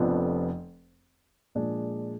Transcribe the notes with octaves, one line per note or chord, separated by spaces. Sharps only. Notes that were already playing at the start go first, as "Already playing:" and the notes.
Already playing: F1 F2 F3 B3 D4
A#2 F3 G#3 D4 G#4